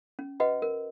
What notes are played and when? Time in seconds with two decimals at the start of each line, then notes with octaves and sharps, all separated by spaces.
0.19 C#4
0.40 F#4 B4 D#5 F#5
0.62 A#4